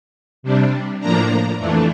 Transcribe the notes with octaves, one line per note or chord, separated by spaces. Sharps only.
C3 G3 D4
A2 F3 A#3 D4 A#5
F2 E3 A3 D4